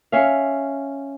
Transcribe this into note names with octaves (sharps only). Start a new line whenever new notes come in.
C#4 E5 F5